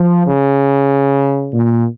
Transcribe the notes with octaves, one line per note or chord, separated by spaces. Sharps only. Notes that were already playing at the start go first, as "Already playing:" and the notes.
Already playing: F3
C#3
A#2